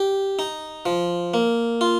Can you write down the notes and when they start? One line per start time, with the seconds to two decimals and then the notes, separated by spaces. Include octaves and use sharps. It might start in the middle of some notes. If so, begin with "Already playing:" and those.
Already playing: G4
0.39 D#4
0.86 F3
1.34 A#3
1.81 F4